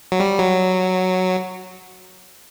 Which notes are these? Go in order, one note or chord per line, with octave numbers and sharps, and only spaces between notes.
F#3
G3
F#3